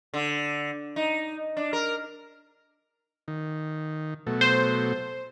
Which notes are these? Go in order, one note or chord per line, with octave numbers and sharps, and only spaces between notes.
D3
D#4
D4
A#4
D#3
B2 F#3 A3
C5